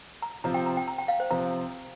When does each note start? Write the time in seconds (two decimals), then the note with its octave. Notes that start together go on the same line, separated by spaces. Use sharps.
0.22 A#5
0.44 C3 F3 C4 F4 A#5
0.54 G5
0.66 A#5
0.77 G5
0.88 A#5
0.98 G5
1.08 F5
1.20 C5
1.30 C3 F3 C4 A#5